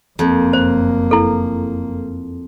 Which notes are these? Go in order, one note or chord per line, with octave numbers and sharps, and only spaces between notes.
F#1 F2 A#3
C5
E4 A4